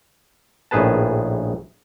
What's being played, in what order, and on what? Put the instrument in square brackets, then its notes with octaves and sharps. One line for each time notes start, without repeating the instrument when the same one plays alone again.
[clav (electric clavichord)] A#1 A2 D#3 G#4 B4 A5